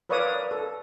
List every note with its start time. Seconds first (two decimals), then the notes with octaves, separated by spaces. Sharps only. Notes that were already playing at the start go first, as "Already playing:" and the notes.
0.09 A#4 B4 C#5 D5 F5 D#6
0.51 A4